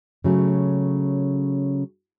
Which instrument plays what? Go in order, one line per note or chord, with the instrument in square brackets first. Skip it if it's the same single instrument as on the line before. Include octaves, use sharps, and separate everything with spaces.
[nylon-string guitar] C#3 F#3 A3